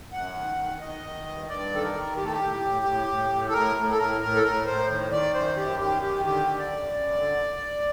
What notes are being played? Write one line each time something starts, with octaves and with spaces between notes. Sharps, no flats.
F#2 F#5
D#3
D#3
D#3 D#5
D#3
G2
G2 D5
D#3 A4
A#4
D#3
A2 G4
A4
G4
A2
A2
A2
A2
A2
A4
A2 A#4
A2
A4
A2 A#4
A2 A#4
A4
A2 A#4
A2 C5
D#3
D#3 D5
F#2 C5
F#2 G4
D#3 G4
D#3 G4
D3 G4
D3
D5
F#2
F#2
D3